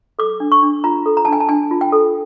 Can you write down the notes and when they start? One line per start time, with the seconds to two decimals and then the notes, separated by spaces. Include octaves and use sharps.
0.19 A4 D6
0.40 D4
0.52 C#6
0.62 D4
0.84 F4 A#5
1.06 A4
1.17 A#5
1.25 A5
1.28 D4 G#5
1.40 A5
1.49 D4 G#5
1.71 F4
1.81 G5
1.92 A4